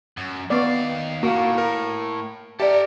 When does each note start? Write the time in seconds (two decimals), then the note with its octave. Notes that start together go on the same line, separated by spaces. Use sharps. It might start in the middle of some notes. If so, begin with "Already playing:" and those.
0.17 F#2
0.50 D#2 B3 D5 F5 C#6 D6
1.23 A2 A#3 F#4
1.58 A#4
2.60 G4 A4 A#4 D5 E5